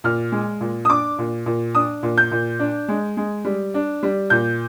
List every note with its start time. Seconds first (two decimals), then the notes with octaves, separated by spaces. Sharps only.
0.04 A#2 F6
0.32 G#3
0.61 A#2
0.85 D#6
0.90 D4 D6
1.19 A#2
1.46 A#2
1.74 D4 D#6
2.03 A#2
2.18 G6
2.31 A#2
2.59 D4
2.88 G#3
3.17 G#3
3.45 G3
3.74 D4
4.03 G3
4.30 A#2 G6